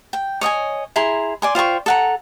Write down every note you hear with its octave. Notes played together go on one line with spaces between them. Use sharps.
G5
C#5 D#5 G5 G#5
E4 G#4 A#5 C6
D5 G#5 C6
F4 C5 G5 C#6
A4 F#5 A#5